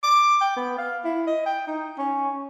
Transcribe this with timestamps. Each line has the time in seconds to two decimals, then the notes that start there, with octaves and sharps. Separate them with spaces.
0.03 D6
0.41 G5
0.56 B3
0.78 F5
1.04 E4
1.27 D#5
1.46 G5
1.67 D#4
1.98 C#4